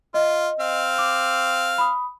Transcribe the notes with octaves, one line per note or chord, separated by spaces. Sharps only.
F4 D#5
C4 F5
D6
B5 D#6